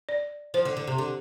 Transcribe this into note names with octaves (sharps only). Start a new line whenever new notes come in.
D5
F3 C5
D3
D3
C3
D3